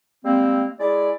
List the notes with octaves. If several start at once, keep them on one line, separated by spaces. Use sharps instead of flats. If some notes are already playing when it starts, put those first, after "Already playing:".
G3 G#3 A#3 C4
G#3 E4 D5